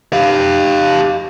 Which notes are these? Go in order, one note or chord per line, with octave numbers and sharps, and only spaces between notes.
G4 F5